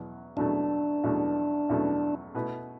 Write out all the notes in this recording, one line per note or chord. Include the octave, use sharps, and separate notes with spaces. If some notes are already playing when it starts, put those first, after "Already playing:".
Already playing: E2 B2 F#3
E2 B2 F#3 A3 D4
E2 B2 F#3 A3
E2 B2 F#3 A3
B2 A3 E4 B4